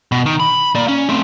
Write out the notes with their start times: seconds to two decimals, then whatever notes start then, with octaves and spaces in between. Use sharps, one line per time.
0.12 B2
0.26 D#3
0.40 B5
0.75 A#3 D5
0.88 C#4
1.09 A3 C4